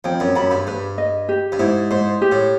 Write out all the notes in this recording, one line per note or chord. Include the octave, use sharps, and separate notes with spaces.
F2 G5
F#2
F#2 B5
G2
G2 B4
D#5
G4
G2
G#2 E4
G#2 C5
G4
A2